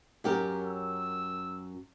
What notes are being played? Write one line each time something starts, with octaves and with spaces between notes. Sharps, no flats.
F#2 G4 A#4
E6